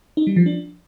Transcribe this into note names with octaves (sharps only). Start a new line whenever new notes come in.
D#4
G3
F3
D4